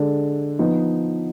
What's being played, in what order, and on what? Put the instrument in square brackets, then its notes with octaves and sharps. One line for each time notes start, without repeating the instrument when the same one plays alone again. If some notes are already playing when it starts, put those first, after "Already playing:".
Already playing: [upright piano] D3 G#3 D4
F3 B3 D#4